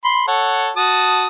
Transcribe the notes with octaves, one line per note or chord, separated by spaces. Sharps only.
B5 C6
A4 C#5 F#5
F#4 A5 D#6